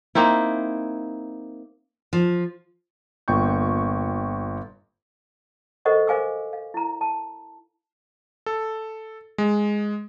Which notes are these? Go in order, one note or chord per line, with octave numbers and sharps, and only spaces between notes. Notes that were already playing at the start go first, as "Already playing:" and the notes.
A#3 C4 D#4 E4
F3
G1 A#2 G5 C#6 G6
A4 A#4 C5 D#5 F#5 C#6
A#4 C5 F5 G#5 D6 E6
F5
E4 A#5
A5
A4
G#3